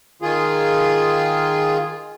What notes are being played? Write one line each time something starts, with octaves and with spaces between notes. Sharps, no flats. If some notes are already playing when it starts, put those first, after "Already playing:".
D#3 F4 G#4